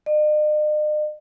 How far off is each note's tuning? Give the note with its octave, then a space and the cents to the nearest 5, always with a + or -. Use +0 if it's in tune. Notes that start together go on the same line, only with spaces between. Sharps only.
D#5 -45